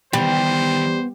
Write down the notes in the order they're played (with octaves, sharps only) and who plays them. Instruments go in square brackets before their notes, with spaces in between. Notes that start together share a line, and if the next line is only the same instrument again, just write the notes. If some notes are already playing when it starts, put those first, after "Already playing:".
[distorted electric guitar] D#3 E3 [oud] G3 [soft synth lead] B3 [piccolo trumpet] C5